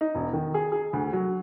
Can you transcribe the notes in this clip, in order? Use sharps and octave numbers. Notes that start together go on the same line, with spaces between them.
D#4
E1
D#3
G#4
G#4
D2
F#3